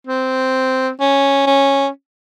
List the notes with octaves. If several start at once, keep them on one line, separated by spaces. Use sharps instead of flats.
C4
C#4
C#4